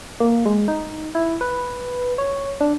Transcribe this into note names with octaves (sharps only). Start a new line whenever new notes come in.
A#3
G#3
D#4
E4
B4
C#5
D4